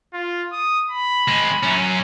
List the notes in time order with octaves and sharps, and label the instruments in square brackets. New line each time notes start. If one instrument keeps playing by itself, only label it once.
[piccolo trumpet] F4
D#6
B5
[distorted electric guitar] G#3 C4
F#2 C#4